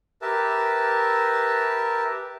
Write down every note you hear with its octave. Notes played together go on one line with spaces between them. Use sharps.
G4 A#4 B4 E5 A5